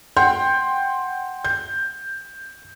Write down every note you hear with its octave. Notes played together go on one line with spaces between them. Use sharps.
F#5 G5 C6 G6
G6